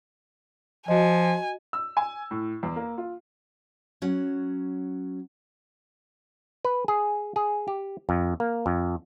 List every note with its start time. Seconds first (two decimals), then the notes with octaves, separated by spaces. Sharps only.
0.88 F3 F#4 D#5 G#5
1.73 E6
1.97 G#5
2.31 A2
2.63 E2
2.76 A#3
2.98 F4
4.02 F#3 C#4 F#5
6.65 B4
6.88 G#4
7.36 G#4
7.68 G4
8.09 F2
8.40 A#3
8.66 F2